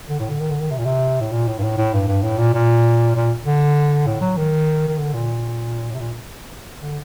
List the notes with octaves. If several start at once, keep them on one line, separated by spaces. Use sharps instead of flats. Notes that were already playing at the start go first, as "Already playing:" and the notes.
D3
A2
D3
D#3
D3
D#3
C3
A#2
C3
A2
A#2
A2
G2
A2
A2
G2
G2
A2
A#2
A#2
A#2
D3
A2
F#3
D#3
D#3
D3
A#2
A2
C3
A#2
D3